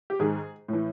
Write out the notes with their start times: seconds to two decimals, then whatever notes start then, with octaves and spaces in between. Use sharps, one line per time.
0.10 G4
0.19 G#2 D#3 G#4
0.68 A2 E3